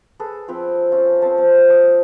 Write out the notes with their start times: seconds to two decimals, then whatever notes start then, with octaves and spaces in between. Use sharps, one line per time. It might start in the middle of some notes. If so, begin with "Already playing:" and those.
0.20 G#4 A4 B4
0.48 F3 C4 B4
0.92 C#4 F4
1.22 C4 C5 A5
1.38 C4
1.70 D#6